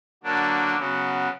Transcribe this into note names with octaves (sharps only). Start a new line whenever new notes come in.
D3 F#3 A#3 D4
C#3 F#3 B3